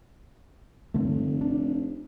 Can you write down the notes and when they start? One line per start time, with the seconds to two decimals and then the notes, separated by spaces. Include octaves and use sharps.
0.94 F1 G2 D3 A3
1.41 D4